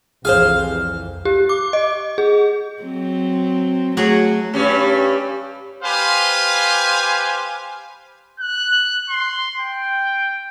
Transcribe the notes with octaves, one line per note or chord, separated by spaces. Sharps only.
C2 F2 E3 G#4 C5 F5
G4
D6
D#5
G#4
F#3 C4
F#3 A3 F#4 G#4
G2 G3 C#4
G4 B4 C5 F5 G#5
F#6
C6
G5